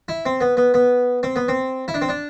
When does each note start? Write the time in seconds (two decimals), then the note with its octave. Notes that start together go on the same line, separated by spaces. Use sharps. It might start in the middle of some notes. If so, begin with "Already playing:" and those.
0.09 E4
0.26 C4
0.41 B3
0.57 B3
0.74 B3
1.23 C4
1.36 B3
1.48 C4
1.88 E4
1.94 D4
2.02 C4
2.09 D4